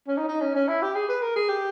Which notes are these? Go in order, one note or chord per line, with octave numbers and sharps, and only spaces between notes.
C#4
D#4
D#4
C#4
C#4
E4
G4
G#4
B4
A#4
G#4
G4